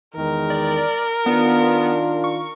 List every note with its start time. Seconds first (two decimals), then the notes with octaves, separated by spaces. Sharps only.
0.15 E2 D#3 G#3 A#4
0.50 D5
1.26 D#3 B3 D4 F4
2.24 C#6